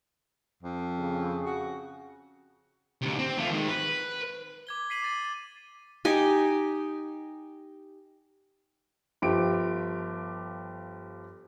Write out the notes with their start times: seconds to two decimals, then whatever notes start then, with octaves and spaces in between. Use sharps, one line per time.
0.63 F2
0.99 C#3
1.46 F#4
3.02 D2 C3
3.19 C4
3.39 A3 F4
3.51 D#3 G#3
3.68 B4
4.67 D6 G#6 G7
4.90 B6 C7 D#7 F#7
5.02 D6 A6 D#7
6.05 D#4 G4 G#5
9.22 G1 F3 G4 D7